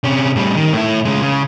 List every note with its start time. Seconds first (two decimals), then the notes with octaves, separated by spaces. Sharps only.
0.04 C3 C#4
0.36 A2 G3
0.57 D#3
0.73 A2 E4
1.05 C#3 G#3
1.22 C#3